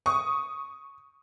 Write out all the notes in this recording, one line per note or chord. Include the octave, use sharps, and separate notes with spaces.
C#6 D#6